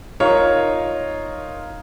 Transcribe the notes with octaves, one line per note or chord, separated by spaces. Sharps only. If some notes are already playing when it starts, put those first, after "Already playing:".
D#4 F4 A#4 C#5 F5